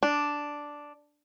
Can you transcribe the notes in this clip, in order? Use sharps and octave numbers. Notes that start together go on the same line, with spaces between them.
D4